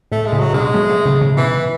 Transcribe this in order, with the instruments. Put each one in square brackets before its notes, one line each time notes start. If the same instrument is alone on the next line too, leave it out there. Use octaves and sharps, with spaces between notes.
[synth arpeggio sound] A2 [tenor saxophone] A3
[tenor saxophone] G#3
[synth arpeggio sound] A2 C#3
[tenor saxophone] F#3
[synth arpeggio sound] B2 D3 [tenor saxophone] G#3
[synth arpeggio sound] F#3 A3
F#3 A3
A2 C#3
A2 C#3
[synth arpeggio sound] G#2 B2 [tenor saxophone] E3